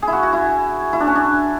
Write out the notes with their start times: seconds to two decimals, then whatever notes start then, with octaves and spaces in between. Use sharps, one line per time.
0.02 E4 G#4
0.13 F#4
0.23 F#4
0.33 E4
0.93 E4
1.00 D4
1.07 C#4
1.15 D4